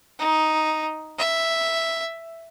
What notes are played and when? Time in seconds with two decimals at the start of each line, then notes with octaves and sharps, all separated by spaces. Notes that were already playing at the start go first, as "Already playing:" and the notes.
0.19 D#4
1.18 E5